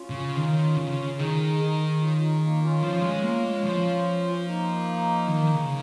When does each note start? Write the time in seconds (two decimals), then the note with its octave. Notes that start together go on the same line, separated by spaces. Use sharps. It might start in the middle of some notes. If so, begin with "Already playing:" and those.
Already playing: C#4 F4
0.10 C#3
0.36 D#3
0.77 C#3
1.18 D#3 D#4 G#4
1.60 D#4 G#4
2.01 C#4 F4
2.20 D#4 G#4
2.41 A#3 D#4
2.62 C#4 F4
2.83 F3
3.02 G#3
3.23 A#3
3.44 G#3
3.64 F3
4.46 A#3 D#4
5.28 D#3
5.55 C#3